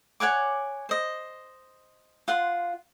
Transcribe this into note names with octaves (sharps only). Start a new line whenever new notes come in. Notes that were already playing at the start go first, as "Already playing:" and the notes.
C#5 F#5 G#5 D6
C5 D#5
F4 F#5 C6